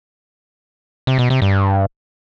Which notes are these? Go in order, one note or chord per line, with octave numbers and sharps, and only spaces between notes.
C3
B2
C3
G2